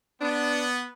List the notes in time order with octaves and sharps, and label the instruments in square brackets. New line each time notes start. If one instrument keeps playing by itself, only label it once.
[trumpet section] B3 [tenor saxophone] D4